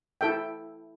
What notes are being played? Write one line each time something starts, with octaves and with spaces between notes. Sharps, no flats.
E4 A4 E5 G5